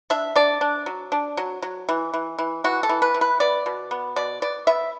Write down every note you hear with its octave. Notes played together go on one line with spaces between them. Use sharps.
D4 E5
D4 D5
D4
F#3
D4
F#3
F#3
E3
E3
E3
E3 F#4
A4
E3
B4
E3
B4
B3 D5
B2
B3
B2 D5
B3 D5
B3 E5